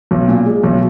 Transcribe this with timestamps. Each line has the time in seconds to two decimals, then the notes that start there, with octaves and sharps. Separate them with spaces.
0.11 B1
0.28 A#2
0.46 G#3
0.63 B1